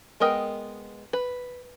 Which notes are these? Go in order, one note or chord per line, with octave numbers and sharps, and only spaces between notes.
G#3 B3 A#4 D#5 G5
B4